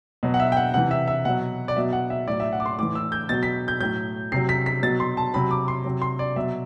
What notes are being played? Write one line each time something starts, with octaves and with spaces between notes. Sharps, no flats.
B2 F#3
F#5
E5
G5
F#5
C3 E3 F#5
E5
E5
B2 F#3 F#5
D5
B2 F#3 E5
F#5
E5
A2 F#3 D5
E5
F#5
D6
C6
A2 E3 D6
E6
G6
B2 F#3 A6
B6
G6
A2 F#3 G6
C3 F#3 C7
B6
B6
B2 F#3 A6
C6
A5
C3 F#3 B5
D6
C6
C3 F#3
C6
D5
B2 F#3 E5